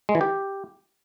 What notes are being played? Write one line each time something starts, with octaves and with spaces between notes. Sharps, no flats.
G#3
E3
G4